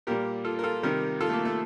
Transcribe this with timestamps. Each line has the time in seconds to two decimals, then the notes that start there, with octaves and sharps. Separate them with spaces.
0.07 A#2 G3 G4 A#4
0.45 F4 A4
0.59 A#4
0.63 F4 A4
0.83 C3 D#3 G3 G4 A#4
1.21 F4 A4
1.29 A3
1.33 A#3
1.45 A3